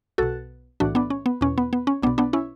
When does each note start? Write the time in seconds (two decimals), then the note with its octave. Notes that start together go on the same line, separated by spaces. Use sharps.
0.18 B1 B2 F#4 A4
0.80 B1 A2 E3 D4 F#4
0.95 B3 D4
1.10 C#4
1.26 B3
1.41 E2 B2 C#4
1.58 B3
1.73 B3
1.87 C#4
2.03 B1 B3 D4
2.07 B2
2.18 B3 D4
2.33 C#4 E4